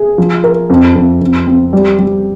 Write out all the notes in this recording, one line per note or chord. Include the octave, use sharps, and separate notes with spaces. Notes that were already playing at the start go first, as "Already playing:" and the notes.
Already playing: G#4
F3
A#4
F2
F2
F2
C4
G3
G3